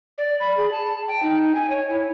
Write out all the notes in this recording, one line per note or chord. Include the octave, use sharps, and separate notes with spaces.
D5
B5
G#4
A5
G5
D#4
G#5
C#5
E4